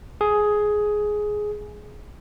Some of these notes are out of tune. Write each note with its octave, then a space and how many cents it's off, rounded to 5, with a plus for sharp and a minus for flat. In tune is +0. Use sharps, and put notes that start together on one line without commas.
G#4 +10